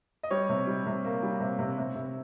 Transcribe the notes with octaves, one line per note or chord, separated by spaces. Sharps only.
D#5
G3 C#5
C3
G3
C3
A#3
G3
C3
C3
C3
C3